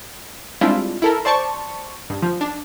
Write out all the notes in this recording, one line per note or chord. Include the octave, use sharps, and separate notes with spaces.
G3 G#3 C4 D4 E4 F4
E4 A4 A#4
C5 D5 A5 C#6
G2
F3
D4